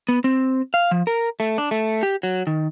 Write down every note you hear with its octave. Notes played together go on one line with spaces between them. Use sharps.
B3
C4
F5
F3
A#4
A3
D4
A3
G4
F#3
D#3